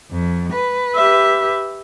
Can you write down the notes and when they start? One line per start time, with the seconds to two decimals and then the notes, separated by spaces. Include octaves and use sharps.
0.11 F2
0.54 B4
0.96 G4 E5